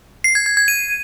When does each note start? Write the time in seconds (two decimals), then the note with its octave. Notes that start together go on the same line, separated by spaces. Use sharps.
0.24 C7
0.35 G#6
0.46 G#6
0.57 G#6
0.68 D#7